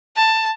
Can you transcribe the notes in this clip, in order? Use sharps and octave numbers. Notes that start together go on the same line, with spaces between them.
A5